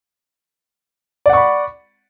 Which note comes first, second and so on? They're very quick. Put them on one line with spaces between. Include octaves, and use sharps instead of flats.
D5 F#5 C#6 B5